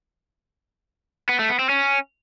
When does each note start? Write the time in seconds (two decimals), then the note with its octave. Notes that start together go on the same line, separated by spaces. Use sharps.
1.29 B3
1.39 A3
1.49 B3
1.59 C4
1.69 C#4